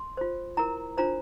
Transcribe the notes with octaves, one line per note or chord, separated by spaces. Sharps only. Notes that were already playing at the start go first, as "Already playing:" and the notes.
Already playing: C6
F4 C5
E4 A#4 A#5
D4 F4 C5 A#5